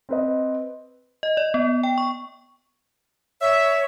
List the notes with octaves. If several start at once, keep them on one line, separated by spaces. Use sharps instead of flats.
C4 B4 D#5
D#5
D5
B3
G5
C#6
C#5 E5